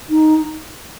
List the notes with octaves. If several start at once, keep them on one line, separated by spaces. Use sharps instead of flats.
D#4